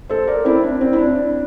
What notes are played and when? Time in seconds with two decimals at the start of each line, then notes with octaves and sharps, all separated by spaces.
0.10 A4 C5
0.27 A#4 D5
0.45 C4 E4
0.63 D4
0.81 C4
0.93 E4
0.98 D4